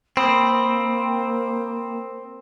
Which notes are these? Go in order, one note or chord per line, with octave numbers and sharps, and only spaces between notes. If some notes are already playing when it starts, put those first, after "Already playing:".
A#3 C4 B5 D#6